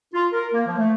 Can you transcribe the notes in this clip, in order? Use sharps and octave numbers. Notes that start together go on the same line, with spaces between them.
F4
A#4
A#3
F3
A3